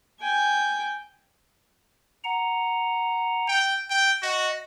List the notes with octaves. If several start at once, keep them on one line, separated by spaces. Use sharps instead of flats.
G5 G#5
F#5 A#5
G5
G5
F#4 D#5